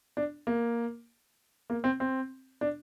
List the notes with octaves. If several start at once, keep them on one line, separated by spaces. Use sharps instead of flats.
D4
A#3
A#3
C4
C4
D4